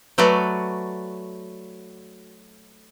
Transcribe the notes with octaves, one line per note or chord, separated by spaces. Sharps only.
F#3 A3 F#4 B4 D5